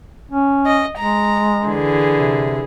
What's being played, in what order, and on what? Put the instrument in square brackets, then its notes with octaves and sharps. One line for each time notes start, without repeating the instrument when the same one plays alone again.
[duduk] C#4
[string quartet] D#5
[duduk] G#3 [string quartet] A#5
[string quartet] D3 E3 G#4
[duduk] C3